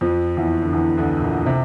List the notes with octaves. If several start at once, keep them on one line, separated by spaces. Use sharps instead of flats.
F2 F3
E2 E3
D3
E2 E3
D2 D3
A#2
C3